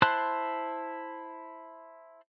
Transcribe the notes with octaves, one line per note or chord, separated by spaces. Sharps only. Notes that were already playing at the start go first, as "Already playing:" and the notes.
E4 C5 A5 C6 F#6